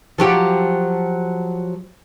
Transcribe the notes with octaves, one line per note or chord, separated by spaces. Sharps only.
F3 F#3 G4